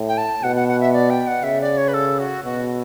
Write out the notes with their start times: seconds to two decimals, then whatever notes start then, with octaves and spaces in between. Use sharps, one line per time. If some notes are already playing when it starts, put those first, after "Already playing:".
Already playing: A2
0.08 G5
0.18 A5
0.43 B2 F#5
0.56 F#5
0.68 F#5
0.81 E5
0.93 D5
1.10 G5
1.27 F#5
1.43 C#3 E5
1.61 D5
1.77 C#5
1.88 B4
1.94 A4
2.19 F#4
2.44 B2 F#4